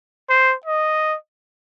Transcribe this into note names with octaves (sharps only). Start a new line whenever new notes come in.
C5
D#5